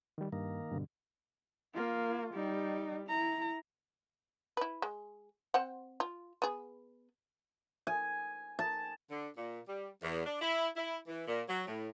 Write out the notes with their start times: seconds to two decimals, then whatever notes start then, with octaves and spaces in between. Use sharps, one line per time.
0.18 D#3 G3
0.33 G2 D#3 A#3
0.72 G2 B2 D3
1.75 A#3 F4
2.34 G3 D#4
3.08 E4 A#5
4.57 E4 B4
4.82 G#3
5.54 C4 C5 F#5
6.00 F4
6.42 B3 G#4
7.87 G#5
8.59 A5
9.10 D3
9.36 A#2
9.67 G3
10.02 E2
10.26 D4
10.41 E4
10.76 E4
11.07 E3
11.27 A#2
11.48 F#3
11.67 A2